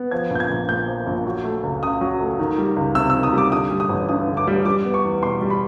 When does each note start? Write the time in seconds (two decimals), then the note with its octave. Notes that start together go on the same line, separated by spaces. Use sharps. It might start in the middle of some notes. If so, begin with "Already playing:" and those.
Already playing: B3
0.11 F3 G#6
0.31 A#1 G6
0.40 G#6
0.50 A#1
0.69 A#2 G6
0.88 F3
1.07 A#1
1.26 F#3
1.44 A3
1.63 C#2
1.82 C#3 D#6
2.01 F#3
2.20 A3
2.39 D#3
2.58 G3
2.76 C#2
2.95 C3 E6
3.10 D#3 E6
3.23 D#6
3.33 G3
3.38 D6
3.52 D3 D#6
3.71 G3
3.80 D#6
3.89 A1
4.09 G2 D#6
4.28 D3
4.37 D6
4.47 G3
4.65 G3 D6
4.85 B3
4.94 C#6
5.04 E2
5.22 B2 C6
5.41 G3
5.50 B5